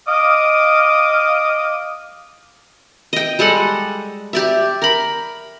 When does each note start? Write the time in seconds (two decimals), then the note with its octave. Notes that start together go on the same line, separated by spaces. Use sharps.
0.08 D#5 F5 D6 D#6
3.13 D#5 G5
3.39 G3 G#3 A4 F#5
4.33 G4 D5 E5
4.82 A#4 B5